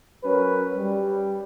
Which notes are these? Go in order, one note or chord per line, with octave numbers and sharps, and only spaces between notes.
F#3 C#4 A#4 B4
G3